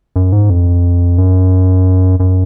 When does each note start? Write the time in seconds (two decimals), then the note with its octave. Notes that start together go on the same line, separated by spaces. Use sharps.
0.16 F#2
0.32 G#2
0.50 F2
1.18 F#2
2.20 F#2